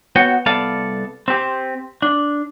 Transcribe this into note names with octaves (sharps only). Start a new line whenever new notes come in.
B3 F#4 C#5 G5
C2 B3 A4 D5 F5
C4 G4
D4